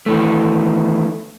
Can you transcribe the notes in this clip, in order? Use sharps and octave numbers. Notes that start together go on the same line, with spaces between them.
D#3 E3 A3